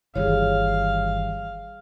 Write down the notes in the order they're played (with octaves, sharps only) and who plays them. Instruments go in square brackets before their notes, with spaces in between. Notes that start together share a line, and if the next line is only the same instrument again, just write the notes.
[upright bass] G1 [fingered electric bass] D#3 E3 G3 [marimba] G#4 C#5 [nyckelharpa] F5